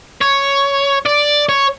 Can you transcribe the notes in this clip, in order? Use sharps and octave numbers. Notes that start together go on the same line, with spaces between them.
C#5
D5
C#5